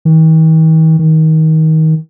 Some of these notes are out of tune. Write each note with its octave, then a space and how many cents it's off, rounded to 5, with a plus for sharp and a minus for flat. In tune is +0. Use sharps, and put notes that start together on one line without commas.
D#3 +45
D#3 +25